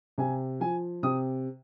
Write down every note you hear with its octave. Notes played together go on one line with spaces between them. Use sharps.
C3 G#5
F3 G#5
C3 D#6